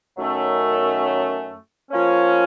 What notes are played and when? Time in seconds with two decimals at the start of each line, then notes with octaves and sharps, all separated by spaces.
0.16 F#2 D#3 F#3 A3 C#4
1.91 F3 A#3 C#4